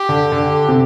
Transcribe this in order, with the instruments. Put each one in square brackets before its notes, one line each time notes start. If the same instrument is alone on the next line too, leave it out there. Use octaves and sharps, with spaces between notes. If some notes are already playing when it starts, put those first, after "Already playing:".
Already playing: [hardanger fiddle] G4
[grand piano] D3
D3
C3